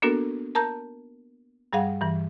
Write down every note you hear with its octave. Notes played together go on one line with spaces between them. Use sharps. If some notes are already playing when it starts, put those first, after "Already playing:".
A#3 B3 D4 F#4 A4 A#4
A#4 A5 A#5 G6
G2 G3 G#4 F5 F#5
G2 E3